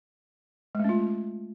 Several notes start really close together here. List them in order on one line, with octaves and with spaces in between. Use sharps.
G#3 A3 C#4 F4